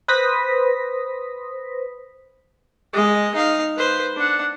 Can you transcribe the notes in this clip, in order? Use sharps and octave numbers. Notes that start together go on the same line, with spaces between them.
B4 C5 D#6 A#6 B6
G#3 D#5
D#4 F5
B4 C5
D4 F#5